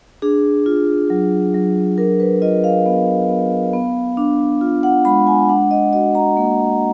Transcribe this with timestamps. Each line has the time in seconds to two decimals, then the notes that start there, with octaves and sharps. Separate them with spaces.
0.22 D4 G#4
0.66 F4
1.10 F#3
1.54 F#3
1.98 D4 A#4
2.20 B4
2.42 F4 D#5
2.64 F5
2.86 B3
3.29 B3
3.73 B3
4.17 D4
4.61 F4
4.83 F#5
5.05 G#3 B5
5.27 G#5
5.49 D4 F#5
5.71 D#5
5.93 F#4 D#5
6.15 A#5
6.37 A#3